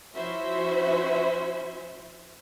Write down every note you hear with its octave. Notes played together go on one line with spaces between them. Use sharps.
F3 C#4 E4 F#4 C5 E5